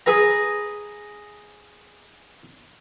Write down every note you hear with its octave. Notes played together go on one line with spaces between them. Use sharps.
G#4 B4 A#5